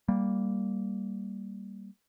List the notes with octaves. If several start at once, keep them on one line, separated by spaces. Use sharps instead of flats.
G3 A#3